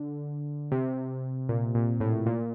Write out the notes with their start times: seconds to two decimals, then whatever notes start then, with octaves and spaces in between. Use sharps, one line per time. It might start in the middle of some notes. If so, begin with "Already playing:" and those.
Already playing: D3
0.72 C3
1.49 A#2
1.75 A#2
2.00 A2
2.26 A#2